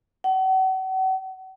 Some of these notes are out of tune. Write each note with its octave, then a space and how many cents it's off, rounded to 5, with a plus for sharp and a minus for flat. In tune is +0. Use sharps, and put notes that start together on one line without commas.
F#5 +40